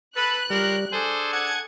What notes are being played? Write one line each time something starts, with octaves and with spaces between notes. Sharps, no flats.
A4 B4 F#6
C#3 G3 F4 G4 A#4
D4 G#4 A4 C5 G#5
F#5 G#6